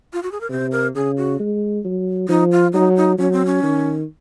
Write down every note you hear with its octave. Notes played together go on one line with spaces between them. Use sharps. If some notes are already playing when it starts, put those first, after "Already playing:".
F4
F#4
G#4
A#4
C3 C5
A#4
C#3 G#4
F#4
G#3
F#3
F3 D#4
F4
F#3 D#4
D#4
F#3 C#4
C4
C#4
D#3